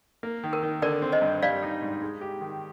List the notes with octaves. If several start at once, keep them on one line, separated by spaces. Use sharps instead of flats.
A#3
D#3
A#4
D#3
D3 A#4 D5
C4
C5 D#5
G2
G3 D5 F5
D#4
G#2
G#3
G4
D#3